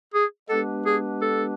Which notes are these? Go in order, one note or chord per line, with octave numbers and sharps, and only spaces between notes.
G#4
G#3 B3 D4 G4 A4 B4
G#4
A4